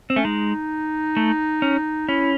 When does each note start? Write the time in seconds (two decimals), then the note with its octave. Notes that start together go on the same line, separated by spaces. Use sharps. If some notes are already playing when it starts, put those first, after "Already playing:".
0.10 C4
0.16 A3 C#4
0.24 G#3 D#4
1.17 A3
1.62 C#4
2.08 C#4 E4